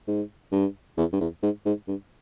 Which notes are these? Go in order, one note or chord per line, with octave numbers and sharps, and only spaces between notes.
G#2
G2
E2
G2
E2
G#2
G#2
G2